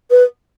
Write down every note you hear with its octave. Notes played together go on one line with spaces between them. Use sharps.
B4